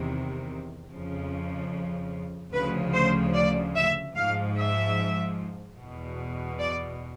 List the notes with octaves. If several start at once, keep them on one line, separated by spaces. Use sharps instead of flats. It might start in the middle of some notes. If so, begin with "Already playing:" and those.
Already playing: E2 C3 D#3
F2 C#3 F3
D2 C#3 F3 B4
C5
D5
E5
G#2 F3 F5
E5
E2 B2
D5